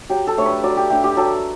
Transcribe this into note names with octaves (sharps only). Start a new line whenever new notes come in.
F#3 G4
A4
A3 D4 C#5
B4
F#3 D5
G4
A3 D4 G4
G4
F#3 A4